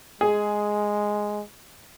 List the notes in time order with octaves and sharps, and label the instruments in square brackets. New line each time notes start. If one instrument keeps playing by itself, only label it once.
[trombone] G#3 [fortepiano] G#4